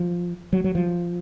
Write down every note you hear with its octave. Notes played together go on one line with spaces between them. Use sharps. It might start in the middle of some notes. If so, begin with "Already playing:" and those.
Already playing: F3
F#3
F#3
F3